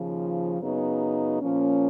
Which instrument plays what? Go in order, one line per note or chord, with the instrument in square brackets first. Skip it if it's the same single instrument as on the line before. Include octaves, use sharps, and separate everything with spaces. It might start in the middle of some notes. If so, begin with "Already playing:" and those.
Already playing: [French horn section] D#2 C#3 F3
F#2 C#3 F#3 B3 D#4
A#2 F3 A#3 C#4